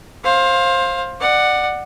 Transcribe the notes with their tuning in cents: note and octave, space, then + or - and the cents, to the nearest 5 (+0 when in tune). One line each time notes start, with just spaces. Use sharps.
C5 +20 F5 +10
D5 +25 F#5 +0